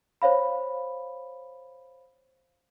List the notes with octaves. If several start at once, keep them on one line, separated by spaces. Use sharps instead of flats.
C5 C#5 F5 B5